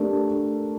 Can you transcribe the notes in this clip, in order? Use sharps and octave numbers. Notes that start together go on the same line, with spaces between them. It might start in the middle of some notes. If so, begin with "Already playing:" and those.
Already playing: A3 D4 G4 A#4